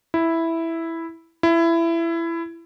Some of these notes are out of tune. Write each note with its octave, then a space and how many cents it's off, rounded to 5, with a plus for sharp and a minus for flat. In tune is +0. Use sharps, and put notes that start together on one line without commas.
E4 +0
E4 +20